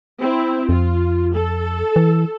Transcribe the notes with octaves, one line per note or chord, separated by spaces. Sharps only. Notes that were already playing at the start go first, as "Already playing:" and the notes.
C4 E4
F2 F4
A4
E3